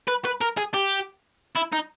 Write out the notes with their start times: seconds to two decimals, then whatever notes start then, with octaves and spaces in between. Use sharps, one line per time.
0.08 B4
0.25 B4
0.41 A#4
0.58 G#4
0.74 G4
1.56 E4
1.73 D#4